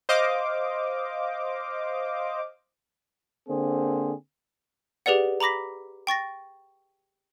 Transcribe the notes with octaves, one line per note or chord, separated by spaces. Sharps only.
C5 D#5 F5 D6
D3 A#3 C4 G#4 C5
G4 G#4 B4 D5 F#5
A#5 B5 D6 A#6 B6
G5 C#6 A6 A#6